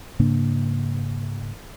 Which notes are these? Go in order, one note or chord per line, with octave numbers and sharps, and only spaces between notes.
G#2 C#3 A#3 D4